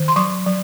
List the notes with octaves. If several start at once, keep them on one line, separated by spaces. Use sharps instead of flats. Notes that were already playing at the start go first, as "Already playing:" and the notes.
Already playing: D#3
C6
F#3 C#6
F#3